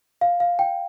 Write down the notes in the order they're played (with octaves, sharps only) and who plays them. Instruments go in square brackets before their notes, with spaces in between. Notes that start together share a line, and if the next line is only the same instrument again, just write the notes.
[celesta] F5
F5
G5